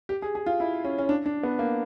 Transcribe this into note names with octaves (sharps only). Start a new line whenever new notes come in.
G4
G#4
G#4
F4
E4
C#4
C#4
D4
D4
B3
A#3